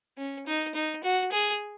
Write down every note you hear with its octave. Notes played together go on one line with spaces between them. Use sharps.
C#4
D#4
D#4
F#4
G#4